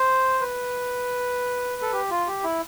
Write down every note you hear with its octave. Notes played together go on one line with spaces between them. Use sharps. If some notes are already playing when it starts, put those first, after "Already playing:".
Already playing: C5
B4
A4
G4
F4
G4
E4